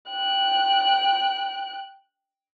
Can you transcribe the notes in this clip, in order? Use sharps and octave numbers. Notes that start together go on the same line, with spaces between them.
G5 F#6